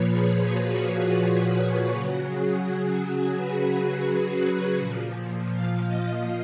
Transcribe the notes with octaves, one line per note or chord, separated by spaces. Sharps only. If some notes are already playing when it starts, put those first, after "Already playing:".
Already playing: A#2 F3 B4 C#5
G#4
F#4
C#3 F#3 F#4
G#4
B4
A#2 F3
F5
D#5